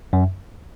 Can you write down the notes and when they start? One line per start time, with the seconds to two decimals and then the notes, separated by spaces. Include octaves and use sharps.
0.13 F#2